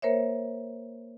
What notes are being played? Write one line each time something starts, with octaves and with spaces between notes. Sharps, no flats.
A#3 A#4 C5 C#5 E5